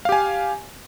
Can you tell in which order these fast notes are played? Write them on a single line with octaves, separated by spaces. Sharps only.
F5 G4 G#5